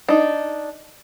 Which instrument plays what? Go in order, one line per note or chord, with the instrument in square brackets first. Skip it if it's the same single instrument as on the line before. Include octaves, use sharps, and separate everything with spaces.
[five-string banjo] D4 D#4